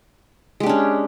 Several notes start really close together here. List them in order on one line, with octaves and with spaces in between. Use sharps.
G#3 G4 D4 C#4